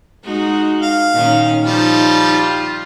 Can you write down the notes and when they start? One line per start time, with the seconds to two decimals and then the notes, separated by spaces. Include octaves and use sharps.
0.24 G#3 D#4 F#4
0.82 F5
1.12 A#2 D#3 C#4
1.64 F3 G3 D#4
2.32 F4